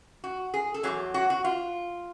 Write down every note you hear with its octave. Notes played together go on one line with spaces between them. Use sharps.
F#4
G#4
A4
E2 B2 F#3 G#4
F#4
F#4
F4